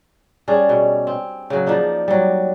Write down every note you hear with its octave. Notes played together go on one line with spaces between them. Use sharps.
G3 C#4 D4 G#4
B2
C4
C#3 F#3
F3 A#3 D4 D#4
F#3 G3